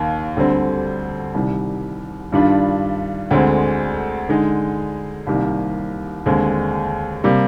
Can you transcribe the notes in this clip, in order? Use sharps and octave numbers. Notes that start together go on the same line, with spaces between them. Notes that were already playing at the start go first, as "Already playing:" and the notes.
Already playing: D#2 D#3 A#3
D2 D3 G3 C4
C2 C3 D#3 G3
G2 D#3 G3 D4 F4
D2 D3 G#3 C4
D3 G#3 D#4
C2 C3 D#3 G3 A#3
D#2 D3 G#3 C4
C3 G3 A#3